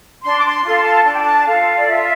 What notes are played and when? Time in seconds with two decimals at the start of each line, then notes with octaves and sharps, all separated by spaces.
0.22 D4 C6
0.38 D6
0.44 C6
0.63 F4 A4 C6
0.84 A5
1.04 D4 A5
1.12 G5
1.19 A5
1.46 F4 A4 F5
1.76 D5
1.87 F4 E5